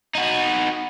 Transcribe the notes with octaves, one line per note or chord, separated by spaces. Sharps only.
D#4 F#4